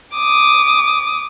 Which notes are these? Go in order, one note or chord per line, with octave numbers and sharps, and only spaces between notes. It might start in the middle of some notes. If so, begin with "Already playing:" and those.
D6 D#6